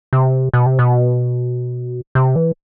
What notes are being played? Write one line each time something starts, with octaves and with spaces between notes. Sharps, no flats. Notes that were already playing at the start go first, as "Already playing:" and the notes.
C3
B2
C3
B2
C3
E3